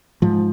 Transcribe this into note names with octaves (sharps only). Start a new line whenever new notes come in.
G#2 F3